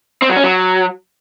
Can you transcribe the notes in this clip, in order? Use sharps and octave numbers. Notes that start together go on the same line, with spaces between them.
C4
F#3
C#4
F#3